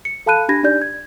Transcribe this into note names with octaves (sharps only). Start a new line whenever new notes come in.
C#7
A4 F5 A5 B5 F#6 D#7
D4 G4 B5 G#6 A#6
D4 D#4 G4 D5 G6
G#6